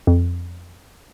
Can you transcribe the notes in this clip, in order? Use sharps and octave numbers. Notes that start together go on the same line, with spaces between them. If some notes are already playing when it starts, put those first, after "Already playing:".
F2